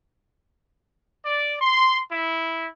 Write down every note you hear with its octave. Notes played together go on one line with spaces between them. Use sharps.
D5
C6
E4